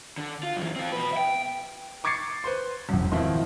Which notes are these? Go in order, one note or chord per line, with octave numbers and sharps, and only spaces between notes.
D3
F4
F#2 E3
C4 F4
B2 B4
E5 G5
C#6 D6 G#6 A6 C7 C#7
B4 C5 C6
E1 F#2
B2 D#3 F3 C4 E4